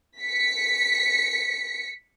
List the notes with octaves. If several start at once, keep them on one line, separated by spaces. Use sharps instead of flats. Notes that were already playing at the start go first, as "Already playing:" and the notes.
B6 C#7